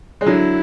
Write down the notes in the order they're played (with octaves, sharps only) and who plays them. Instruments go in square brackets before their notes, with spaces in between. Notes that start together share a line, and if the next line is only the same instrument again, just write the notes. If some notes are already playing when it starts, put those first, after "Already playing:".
[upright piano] G#3
[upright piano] D3 F#3 [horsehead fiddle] E4